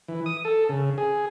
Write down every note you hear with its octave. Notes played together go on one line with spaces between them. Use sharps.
E3
D#6
A4
C#3
G#4